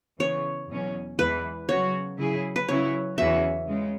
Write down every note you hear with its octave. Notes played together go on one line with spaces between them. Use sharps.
C#3 E3 B3 C#5
E2 B2 F#3 C#4
E2 E3 G#3 E4 B4
C#3 F#3 C#4 F#4 C#5
C#3 F#3 E4 G#4
B4
C#3 F#3 C#4 E4 C#5
E2 C#3 E3 C#4 F#4 E5
C#3 G#3